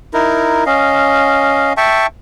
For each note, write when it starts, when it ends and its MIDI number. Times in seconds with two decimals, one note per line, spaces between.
0.14 0.64 63
0.14 0.64 64
0.14 0.64 70
0.66 1.73 61
0.66 1.73 75
0.66 1.73 77
1.77 2.07 76
1.77 2.07 79
1.77 2.07 81
1.77 2.07 85